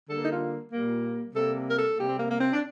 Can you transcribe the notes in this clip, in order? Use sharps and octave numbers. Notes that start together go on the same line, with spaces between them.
D3 G3 A#3 A4
D#4
F4
A#2 G3 A#3
C3 G3 A#3 A4
A#4
A4
C3 G3 A#3 G4
C4
A#3
A#3
C4
D4